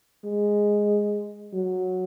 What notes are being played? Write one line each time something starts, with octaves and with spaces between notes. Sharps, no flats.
G#3
F#3